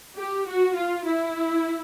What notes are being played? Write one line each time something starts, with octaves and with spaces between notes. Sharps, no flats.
G4
F#4
F4
E4